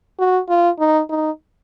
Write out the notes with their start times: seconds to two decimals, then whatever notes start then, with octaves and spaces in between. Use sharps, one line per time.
0.19 F#4
0.49 F4
0.79 D#4
1.09 D#4